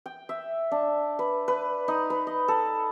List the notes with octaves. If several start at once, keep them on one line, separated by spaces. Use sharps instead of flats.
G5
E5
D4
B4
B4
D#4
B4
D#5
A4